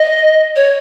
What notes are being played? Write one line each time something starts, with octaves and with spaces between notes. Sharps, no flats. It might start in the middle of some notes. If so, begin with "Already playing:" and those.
Already playing: D#5
C#5